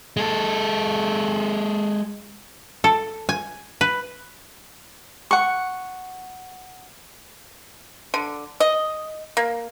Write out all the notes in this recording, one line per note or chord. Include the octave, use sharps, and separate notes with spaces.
G#3 A4
A4
G#5
B4
F#5 C#6
D3
D#5
A#3